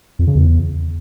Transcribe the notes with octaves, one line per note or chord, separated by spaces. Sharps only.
F2
C#3
E2